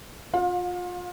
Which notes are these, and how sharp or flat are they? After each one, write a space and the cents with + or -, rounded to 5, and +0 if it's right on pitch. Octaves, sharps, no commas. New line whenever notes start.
F4 +25 F5 +45